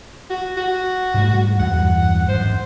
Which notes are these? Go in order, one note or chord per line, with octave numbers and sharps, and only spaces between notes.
F#4
F#4
G#2 G3 A3
E2 G2 F#5
G#1 F#2 C5